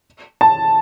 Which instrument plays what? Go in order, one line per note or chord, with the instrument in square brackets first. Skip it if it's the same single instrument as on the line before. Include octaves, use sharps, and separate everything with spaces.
[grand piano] A5